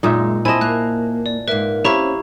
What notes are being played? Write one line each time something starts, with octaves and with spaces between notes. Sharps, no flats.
F#2 A#2 G#3 D#4 E5
C4 E4 D#5 G#5 A5
A#3 F#6
D5
G#2 A#3 B4 E5
C4 C#4 E4 G4 E5 F5 A#5 C#6